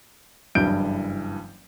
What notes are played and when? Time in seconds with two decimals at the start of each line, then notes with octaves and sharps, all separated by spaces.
0.55 F#1 G2 E3 E4 G6 D7